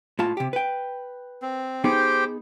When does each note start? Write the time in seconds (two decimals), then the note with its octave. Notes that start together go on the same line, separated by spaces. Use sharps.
0.19 A2 F4 A5
0.37 C3 G4
0.53 B4 G5
1.42 C4
1.84 B3 D#4 G4 G#4 C5 G5